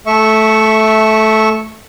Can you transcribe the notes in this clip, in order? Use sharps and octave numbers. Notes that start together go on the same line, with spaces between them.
A3 E5 C#6